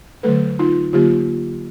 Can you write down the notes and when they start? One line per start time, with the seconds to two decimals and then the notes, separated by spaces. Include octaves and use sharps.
0.23 D3 F#3 A3 A4 B4
0.59 D#4 F4
0.93 D3 F#3 A#3 F4 G4